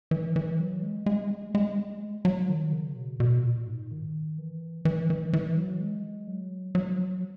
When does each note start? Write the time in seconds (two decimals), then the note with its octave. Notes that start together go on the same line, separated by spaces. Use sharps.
0.11 E3
0.36 E3
0.59 F#3
0.82 G#3
1.06 G#3
1.55 G#3
2.25 F#3
2.49 D#3
2.72 C#3
2.96 B2
3.20 B2
3.44 A#2
3.67 G#2
3.91 D#3
4.38 E3
4.85 E3
5.10 E3
5.33 E3
5.57 F#3
5.80 G#3
6.28 F#3
6.75 F#3